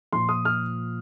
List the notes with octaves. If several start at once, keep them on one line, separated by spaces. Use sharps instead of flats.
A#2 F3 C6
D#6
F6